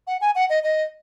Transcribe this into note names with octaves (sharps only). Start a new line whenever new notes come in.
F#5
G#5
F#5
D#5
D#5